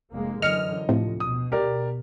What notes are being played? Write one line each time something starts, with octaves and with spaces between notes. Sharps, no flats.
F1 G#3 A#3
F#2 D3 E3 D#5 F6 C#7
D2 A2 C3 F3
B2 D#6
G4 A#4 D5